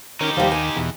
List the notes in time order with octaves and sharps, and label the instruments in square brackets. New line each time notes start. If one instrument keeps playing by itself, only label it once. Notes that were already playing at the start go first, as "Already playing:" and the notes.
[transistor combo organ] D#3 C#4 A#4 [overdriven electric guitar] D#4 G4
[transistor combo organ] D#2 [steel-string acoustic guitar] F3 G3
[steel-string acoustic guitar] G#5
[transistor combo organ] E2 B2